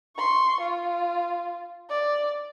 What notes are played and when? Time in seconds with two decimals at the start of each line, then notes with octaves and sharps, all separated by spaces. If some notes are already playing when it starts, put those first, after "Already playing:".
0.17 C6 C#6
0.60 F4
1.90 D5